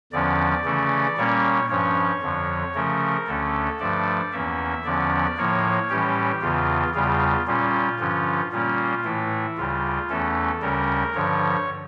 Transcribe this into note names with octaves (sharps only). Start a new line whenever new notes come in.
E2 D3 F3 C#4 D5
C#3 E3 A3 C#4
A#2 G3 A#3 C#4 C#5
G2 F3 C#4 C#5
F2 D3 F3
C#3 F3 A3 C#4 A#4
D2 D3 A3 C#4 A4
G2 F3 A3 D5
E2 E3 A#3 C#4 E5
E2 D3 F3 C#4 D5
A2 F3 A#3 C#5
A2 E3 G3 C#4 G4
E2 C#3 E3 F4
E2 C#3 G3 F4
A#2 G3 C#4 F4
G2 D3 F3 C#4
A#2 G3 A#3 C#4 F4
A2 E3 A3 E4
D2 C#3 G3 F4
E2 E3 A3 C#4 A4
D2 C#3 G3 C#4 A#4
G2 D3 F3 C#5